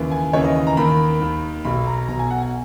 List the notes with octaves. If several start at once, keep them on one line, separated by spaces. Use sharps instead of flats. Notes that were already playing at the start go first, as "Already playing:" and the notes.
Already playing: D#2 C#3 E3
G#5
D#2 C#3 E3 C#5
D#5
D#5
A#5
D#2 D#3 B5
D#2 D#3
B1 B2 B5
A#5
A#5
B1 B2 A#5
G#5
F#5
G#5